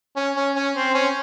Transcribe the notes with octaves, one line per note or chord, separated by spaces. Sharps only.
C#4
C#4
C#4
C4
C#4